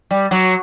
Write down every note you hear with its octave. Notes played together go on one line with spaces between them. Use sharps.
G3
F#3